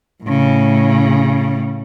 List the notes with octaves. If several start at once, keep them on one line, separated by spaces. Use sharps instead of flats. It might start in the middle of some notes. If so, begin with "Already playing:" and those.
A2 C#3